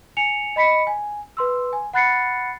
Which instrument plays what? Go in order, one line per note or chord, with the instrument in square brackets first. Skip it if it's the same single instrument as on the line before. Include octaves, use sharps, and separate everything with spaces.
[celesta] G#5 C#7 F7
D#5 B5 B6 C#7
G#5
B4 C6 E6
G#5
F#5 B5 F#6 A6 C7 C#7